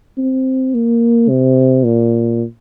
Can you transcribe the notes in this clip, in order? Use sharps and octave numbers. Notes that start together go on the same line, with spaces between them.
C4
A#3
C3
A#2